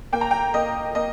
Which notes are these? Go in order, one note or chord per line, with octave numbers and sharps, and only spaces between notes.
A#3 G5
A#5
G5
A#3 D#5
A#3 D#5